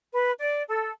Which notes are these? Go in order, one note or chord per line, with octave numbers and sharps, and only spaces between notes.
B4
D5
A4